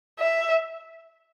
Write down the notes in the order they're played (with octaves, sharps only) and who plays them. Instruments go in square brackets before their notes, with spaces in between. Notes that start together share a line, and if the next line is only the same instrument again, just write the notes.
[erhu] E5